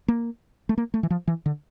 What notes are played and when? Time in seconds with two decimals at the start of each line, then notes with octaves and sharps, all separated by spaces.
0.08 A#3
0.69 A3
0.78 A#3
0.94 A3
1.03 E3
1.10 F3
1.27 E3
1.46 D3